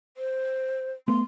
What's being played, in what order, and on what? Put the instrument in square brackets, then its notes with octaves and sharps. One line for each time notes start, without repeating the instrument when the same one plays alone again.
[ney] C5
[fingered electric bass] A3 B3 [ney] C6